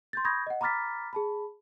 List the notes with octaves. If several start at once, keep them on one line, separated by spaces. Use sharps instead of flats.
C6 G6 A6
B5 C#6 D#6 G6 G#6 A#6
D#5 F#5
A#5 B5 D6 F6 A6 B6
G#4 A5 B5